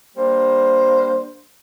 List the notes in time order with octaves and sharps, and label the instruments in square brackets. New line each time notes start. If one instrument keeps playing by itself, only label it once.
[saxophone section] G3 A#3 D4 C5